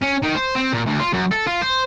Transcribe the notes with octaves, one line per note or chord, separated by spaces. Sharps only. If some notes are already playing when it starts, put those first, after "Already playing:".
C#4
D#3
C5
C4
A#2
D2
F4
F#2
A4
F4
C5